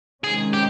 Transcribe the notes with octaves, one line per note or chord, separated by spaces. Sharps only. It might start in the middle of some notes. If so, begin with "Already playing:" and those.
C3 D#3 G#3 C#4 G#4
G4